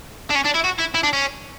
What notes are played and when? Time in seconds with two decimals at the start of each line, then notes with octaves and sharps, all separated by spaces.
0.31 D4
0.36 C#4
0.45 D4
0.55 E4
0.65 F#4
0.79 E4
0.95 E4
1.04 D4
1.13 C#4